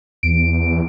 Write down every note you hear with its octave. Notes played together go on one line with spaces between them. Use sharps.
E2 D7